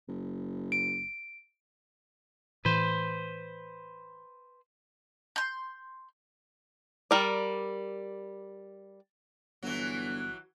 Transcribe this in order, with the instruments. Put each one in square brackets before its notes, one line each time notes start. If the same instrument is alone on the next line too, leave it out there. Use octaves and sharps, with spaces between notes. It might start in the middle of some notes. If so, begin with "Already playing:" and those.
[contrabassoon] F#1
[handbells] D7
[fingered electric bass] A2 E3 [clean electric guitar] B4 C5
[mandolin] C6 G6
[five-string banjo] G3 A#4 D5
[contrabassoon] G1 [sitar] E3 F#3